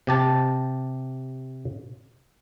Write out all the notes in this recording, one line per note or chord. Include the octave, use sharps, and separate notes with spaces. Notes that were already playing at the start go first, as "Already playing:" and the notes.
C3 G4 A5